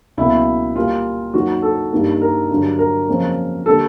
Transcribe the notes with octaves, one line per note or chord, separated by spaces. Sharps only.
C#2 B2 F#3 A#3 E4
A#2 G3 A#3 F4
F#2 D#3 F#3 A#3 F#4
A4
G2 D#3 G3 A#3
A#4
G2 D3 F#3
A#4
F2 C#3 F#3 A#3
D3 G3 A#3 A4